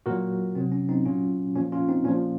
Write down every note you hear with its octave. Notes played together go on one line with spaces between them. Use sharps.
A#2 F#3 F#4 A#4
C3 F#3 C4
C#4
C4 D#4
A#2 F#3 C#4 F4
A#2 F3 C#4
C#4 F4
C4 D#4
A#2 F3 C#4